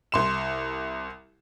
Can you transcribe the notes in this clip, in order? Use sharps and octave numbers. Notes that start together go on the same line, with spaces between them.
C2 C6 E7